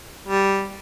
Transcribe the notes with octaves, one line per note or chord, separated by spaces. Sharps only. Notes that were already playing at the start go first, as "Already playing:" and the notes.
G3